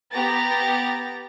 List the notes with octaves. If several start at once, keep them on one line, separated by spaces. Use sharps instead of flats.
B3 G4 A#5 A6